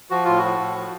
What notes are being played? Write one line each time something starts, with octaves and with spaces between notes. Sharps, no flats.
F3 F#4
A2 F4
F#4
F3
A2
F3